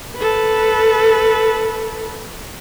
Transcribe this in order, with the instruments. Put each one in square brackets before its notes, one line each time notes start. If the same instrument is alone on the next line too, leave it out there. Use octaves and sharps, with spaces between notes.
[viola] A4 B4